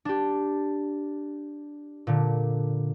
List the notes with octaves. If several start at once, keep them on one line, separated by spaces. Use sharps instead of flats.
D4 G4
A#2 D3